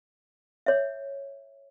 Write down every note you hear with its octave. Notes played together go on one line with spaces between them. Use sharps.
C#5 E5